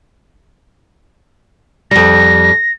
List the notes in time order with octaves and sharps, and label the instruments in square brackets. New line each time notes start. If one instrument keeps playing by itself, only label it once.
[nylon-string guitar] F2 G3 [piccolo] A#6